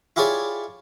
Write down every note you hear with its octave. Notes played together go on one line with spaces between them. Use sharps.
E4 F4 G4 G#4 C#5 D5